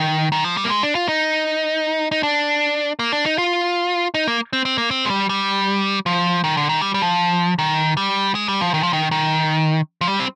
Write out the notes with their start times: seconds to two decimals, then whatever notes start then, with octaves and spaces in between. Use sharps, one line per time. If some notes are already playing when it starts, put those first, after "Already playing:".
Already playing: D#3
0.32 D#3
0.45 F3
0.57 G3
0.64 A#3
0.70 G#3
0.83 D4
0.95 F4
1.08 D#4
2.12 D#4
2.23 D4
2.99 A#3
3.12 D4
3.26 D#4
3.38 F4
4.14 D#4
4.28 A#3
4.53 C4
4.65 C4
4.78 A#3
4.91 C4
5.06 G#3
5.10 G3
5.29 G3
6.06 F3
6.44 D#3
6.57 D3
6.69 D#3
6.82 G3
6.94 G3
7.02 F3
7.59 D#3
7.97 G3
8.35 G#3
8.48 G3
8.61 F3
8.74 D#3
8.83 F3
8.93 D#3
9.11 D#3
10.01 F3
10.08 G3
10.20 C4